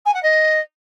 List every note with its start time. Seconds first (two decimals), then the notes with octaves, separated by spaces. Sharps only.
0.05 G#5
0.14 F#5
0.22 D#5